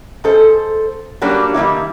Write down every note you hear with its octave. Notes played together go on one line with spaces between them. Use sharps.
G#2 A4 C5
F#3 G3 A#3 D4
D#3 G3 A#3 E4